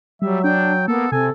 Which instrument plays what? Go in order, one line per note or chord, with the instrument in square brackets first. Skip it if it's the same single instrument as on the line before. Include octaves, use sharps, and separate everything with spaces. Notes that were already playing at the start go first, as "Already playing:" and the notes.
[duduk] F#3 [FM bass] G3 [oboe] E5
[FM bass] D4 [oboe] G5
[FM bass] A#3 [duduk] B3 [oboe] A4
[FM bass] C3 [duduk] A4 [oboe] G#5